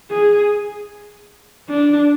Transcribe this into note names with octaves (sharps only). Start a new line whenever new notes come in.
G#4
D4